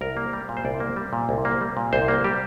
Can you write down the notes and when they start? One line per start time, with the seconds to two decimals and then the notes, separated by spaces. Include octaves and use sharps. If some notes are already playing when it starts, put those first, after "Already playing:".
0.01 C2 A#4
0.17 A#3
0.33 G3
0.49 A#2
0.57 C5
0.65 C2 D5
0.80 A#3
0.96 G3
1.13 A#2
1.29 C2
1.45 A#3
1.61 G3
1.77 A#2
1.93 C2 C5
2.08 A#3
2.24 G3 G4